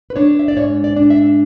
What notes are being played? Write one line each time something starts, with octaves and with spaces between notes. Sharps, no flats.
B4
D4 C#5
E5
D5
G#2 C#5
D5
D4
E5